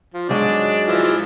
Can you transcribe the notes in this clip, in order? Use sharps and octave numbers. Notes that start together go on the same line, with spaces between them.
F3
G#2 F#3 G#3 D4 D5
E3 F3